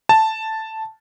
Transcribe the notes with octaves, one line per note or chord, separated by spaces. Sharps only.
A5